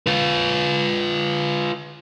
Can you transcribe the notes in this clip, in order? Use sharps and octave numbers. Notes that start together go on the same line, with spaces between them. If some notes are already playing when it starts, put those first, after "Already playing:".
F4 B4